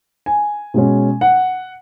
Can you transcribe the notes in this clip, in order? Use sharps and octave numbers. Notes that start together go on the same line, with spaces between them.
G#5
B2 G#3 C#4
F#5